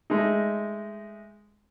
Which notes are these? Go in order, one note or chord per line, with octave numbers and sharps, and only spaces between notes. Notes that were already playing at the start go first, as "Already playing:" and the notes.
G#3 A3 D#4